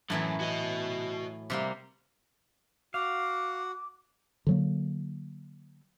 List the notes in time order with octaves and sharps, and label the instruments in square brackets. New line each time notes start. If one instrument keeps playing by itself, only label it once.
[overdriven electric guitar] F#2 [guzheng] A2 E3 F#3
[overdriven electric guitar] F#4 D#5
[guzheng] C3 G3 A#3
[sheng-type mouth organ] F#4 F#5 [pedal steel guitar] F5 [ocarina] D6
[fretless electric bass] D3 F#3 A#3